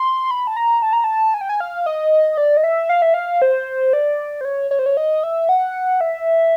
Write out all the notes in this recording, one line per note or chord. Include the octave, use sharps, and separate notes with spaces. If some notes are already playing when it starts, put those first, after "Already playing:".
Already playing: C6
B5
A5
A#5
A5
A#5
A5
G#5
G5
G#5
F5
D#5
D5
D#5
E5
F5
E5
F5
C5
D5
C5
C#5
C#5
C5
C#5
D#5
E5
F#5
E5